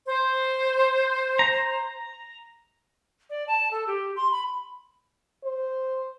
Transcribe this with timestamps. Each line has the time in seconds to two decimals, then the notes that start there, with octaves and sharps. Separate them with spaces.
0.07 C5
1.39 A#5
3.30 D5
3.48 A5
3.71 A4
3.87 G4
4.16 C6
4.32 B5
5.44 C5